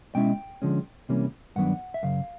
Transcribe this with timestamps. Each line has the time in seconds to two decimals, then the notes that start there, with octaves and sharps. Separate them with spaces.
0.15 B2 G#3 C#4 E4 G5
0.62 D3 F3 G#3 C#4
1.09 C3 E3 G3 A#3 C#4
1.56 G2 D#3 F#3 B3 D4 F#5
1.94 E5
2.03 F#2 C#3 F5